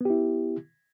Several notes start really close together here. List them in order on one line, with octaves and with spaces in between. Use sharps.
B3 G4 E4